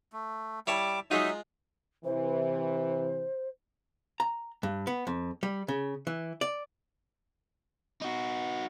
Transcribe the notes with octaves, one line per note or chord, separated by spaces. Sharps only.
A3
G3 E4 C#5 A5 D6
F#3 G#3 D#4 F4 E5
C3 E3 C5
A#5
G2
B3
F2
G3
C#3
E3
D5
D#4 F#4